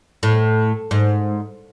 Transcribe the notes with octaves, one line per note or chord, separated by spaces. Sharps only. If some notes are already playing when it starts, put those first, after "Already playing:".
A2
G#2